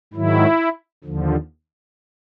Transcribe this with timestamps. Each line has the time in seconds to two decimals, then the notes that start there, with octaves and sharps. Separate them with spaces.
0.13 G#2 D#3 F#3 E4
1.04 D#2 D3 F3